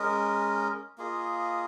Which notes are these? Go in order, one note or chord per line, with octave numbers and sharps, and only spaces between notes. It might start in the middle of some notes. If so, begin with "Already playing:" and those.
Already playing: G#3 C#4 A#4 D#5
A#3 F4 G#4 D#5